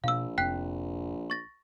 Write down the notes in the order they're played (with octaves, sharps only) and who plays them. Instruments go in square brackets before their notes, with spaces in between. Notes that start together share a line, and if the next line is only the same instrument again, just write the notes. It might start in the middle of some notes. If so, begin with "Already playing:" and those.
[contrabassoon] A#1 [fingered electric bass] B2 [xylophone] F5 E6
[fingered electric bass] F1 C4 [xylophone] G5 F#6 B6
[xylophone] C#6 A6 A#6